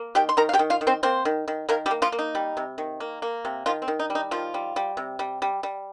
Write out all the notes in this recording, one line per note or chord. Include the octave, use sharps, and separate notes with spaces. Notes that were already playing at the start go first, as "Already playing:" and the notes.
Already playing: A#3
D#3 G4 G5
C6
D#3 A#4 A#5
F5
G4 G5
D#3
F4 F5
D#3
C4 C5
A#3 C4 C5
D#3
D#3
D#3 A#3 A#4
G3 G4
A#3
F3 F4
A#3
D#4
G3
C3
D#3
A#3
A#3
C3
D#3 F3 F4
C4
D#3
D#4
G3
D#4
D#3 F3 F4
G3
G3
C3
G3
G3
G3